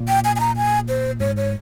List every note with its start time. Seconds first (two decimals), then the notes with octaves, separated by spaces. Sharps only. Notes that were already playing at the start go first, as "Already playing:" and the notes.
Already playing: A#2
0.08 G5
0.24 G#5
0.36 G#5
0.40 A#5
0.57 G#5
0.89 C5
1.20 G#2 C#5
1.37 C#5